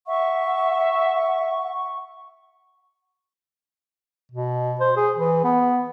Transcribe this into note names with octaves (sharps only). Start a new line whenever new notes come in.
E5 F#5 C#6
B2
C5
G#4
E3
B3